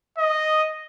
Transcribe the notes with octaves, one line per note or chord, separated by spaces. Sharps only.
D#5